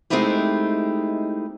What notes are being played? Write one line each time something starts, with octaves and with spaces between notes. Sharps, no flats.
G#3 A3 C4 D#4 E4 G4